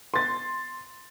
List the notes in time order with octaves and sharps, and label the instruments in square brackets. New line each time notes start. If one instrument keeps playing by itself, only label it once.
[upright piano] C6 A6